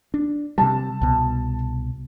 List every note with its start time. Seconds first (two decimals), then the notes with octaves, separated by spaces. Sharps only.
0.14 D4
0.58 C3 G3 A5
1.01 C2 B2